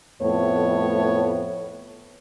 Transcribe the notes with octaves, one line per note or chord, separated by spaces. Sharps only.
F2 A2 A3 B3 C#5